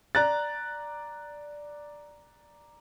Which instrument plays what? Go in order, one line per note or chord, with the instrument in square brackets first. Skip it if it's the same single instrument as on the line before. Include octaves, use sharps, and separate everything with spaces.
[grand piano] D5 A#5 F#6 A6